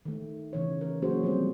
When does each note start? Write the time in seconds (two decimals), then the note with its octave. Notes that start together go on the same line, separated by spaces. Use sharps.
0.05 D#3 A3
0.53 C#3 E3 C#5
0.81 A#4
1.02 F#3 A#3 C#4 F#4 G#4 C5
1.23 F3 G3 G#3 C4 C5